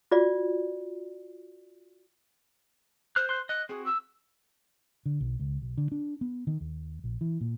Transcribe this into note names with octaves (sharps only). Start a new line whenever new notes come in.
F4 F#4 D5
C5 F6 F#6
C6 F#6
D#5 F#6
C4 F#4 G#4
E6
D3
B1
C#2
B1
D3
D4
B3
D#3
D#2
A#1
E3
A#2